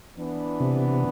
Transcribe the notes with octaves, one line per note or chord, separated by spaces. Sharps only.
E3 B3 D4
C3